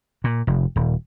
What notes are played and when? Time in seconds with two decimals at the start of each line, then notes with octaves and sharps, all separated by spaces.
0.24 A#2
0.47 F1
0.76 D#1